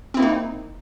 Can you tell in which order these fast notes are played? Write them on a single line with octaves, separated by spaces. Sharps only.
C4 E4 A#3 D#4